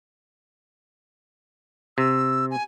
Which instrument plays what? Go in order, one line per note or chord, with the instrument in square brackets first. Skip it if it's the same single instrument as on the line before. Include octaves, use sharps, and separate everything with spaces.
[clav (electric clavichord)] C3 [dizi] E6
[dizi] G#5